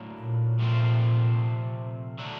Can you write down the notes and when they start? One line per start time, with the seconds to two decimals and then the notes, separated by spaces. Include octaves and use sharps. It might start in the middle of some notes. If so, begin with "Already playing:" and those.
Already playing: A2 F#3 A#3 D4
0.19 A#2
0.59 C3 F3 A3 C4
2.18 D3 F#3 A3 D4